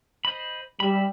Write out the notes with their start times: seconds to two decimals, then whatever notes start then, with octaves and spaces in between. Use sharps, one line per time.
0.25 C5 D#5 B5
0.80 G3 E5 B5